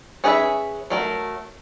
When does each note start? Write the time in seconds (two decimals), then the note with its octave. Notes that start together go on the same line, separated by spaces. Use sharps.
0.24 C#4 G#4 B4 D5 E5
0.90 F#3 A3 A#4